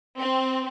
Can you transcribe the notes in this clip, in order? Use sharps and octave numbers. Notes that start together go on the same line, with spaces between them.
C4